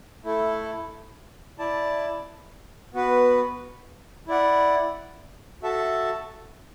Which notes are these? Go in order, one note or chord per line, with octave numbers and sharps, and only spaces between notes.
A3 E4 A4
E4 D5 A5
B3 F#4 B4
E4 D5 F#5
F#4 A4 E5 A5